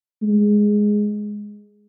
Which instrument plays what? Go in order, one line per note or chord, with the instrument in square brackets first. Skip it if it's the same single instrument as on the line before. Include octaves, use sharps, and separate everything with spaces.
[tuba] G#3